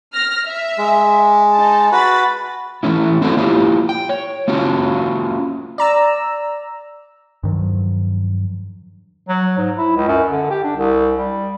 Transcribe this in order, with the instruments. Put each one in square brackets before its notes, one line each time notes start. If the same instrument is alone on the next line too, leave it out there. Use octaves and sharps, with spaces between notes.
[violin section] F6 A#6
E5
[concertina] G#3
[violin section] D#4 A5
[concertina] F#4 B4 [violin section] B5 A6
[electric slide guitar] E3 A3 C#4 E4
C4 E4 F#4 A4 A#4 C#5
A#3 E4 F4 G4
G5
C#5
A#3 C#4 F4 F#4
[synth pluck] D5 A#5 E6
[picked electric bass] G2 D#3 F3 F#3
[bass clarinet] F#3
G#2
E4
C#2
F#2
D3
G4
D4
C2
G3